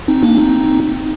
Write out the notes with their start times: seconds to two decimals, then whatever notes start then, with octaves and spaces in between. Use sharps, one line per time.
0.08 C4 D#4
0.23 A#3 D4
0.38 C4 D#4